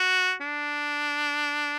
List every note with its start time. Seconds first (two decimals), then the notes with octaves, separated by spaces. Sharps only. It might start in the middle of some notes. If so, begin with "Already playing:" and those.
Already playing: F#4
0.41 D4